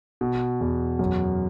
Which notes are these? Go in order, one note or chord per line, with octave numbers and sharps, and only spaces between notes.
B2
E2
F#2